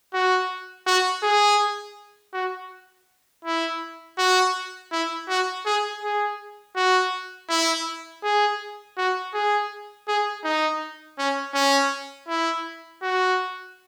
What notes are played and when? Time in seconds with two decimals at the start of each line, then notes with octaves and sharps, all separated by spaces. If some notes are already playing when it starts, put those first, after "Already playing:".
0.13 F#4
0.87 F#4
1.23 G#4
2.33 F#4
3.45 E4
4.18 F#4
4.92 E4
5.29 F#4
5.66 G#4
6.03 G#4
6.76 F#4
7.49 E4
8.23 G#4
8.97 F#4
9.34 G#4
10.08 G#4
10.44 D#4
11.18 C#4
11.54 C#4
12.29 E4
13.02 F#4